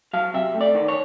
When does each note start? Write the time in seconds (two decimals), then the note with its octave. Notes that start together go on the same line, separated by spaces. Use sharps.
0.13 F#3 F5
0.34 C3 E5
0.54 A3
0.61 D5
0.75 D#3
0.88 C#5